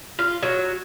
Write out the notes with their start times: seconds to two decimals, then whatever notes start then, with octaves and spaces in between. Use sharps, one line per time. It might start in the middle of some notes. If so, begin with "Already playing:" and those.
0.19 F4
0.42 F#3